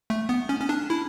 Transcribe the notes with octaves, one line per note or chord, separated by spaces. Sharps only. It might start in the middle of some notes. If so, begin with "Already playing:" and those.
A3
B3
C#4
C#4
D4
E4